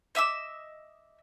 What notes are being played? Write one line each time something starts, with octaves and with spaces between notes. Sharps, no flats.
D#5 E5 D6 E6